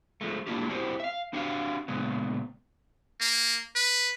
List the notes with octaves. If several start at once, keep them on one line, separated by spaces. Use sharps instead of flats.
F3 G#3 A3
G#3 A#3 D4 E4 F4 G4
C4 E4 F#4 G4 C5
E5 F5
C4 D4 F#4 G4 F5
A#2 C#3 G#3 B3
A#3
B4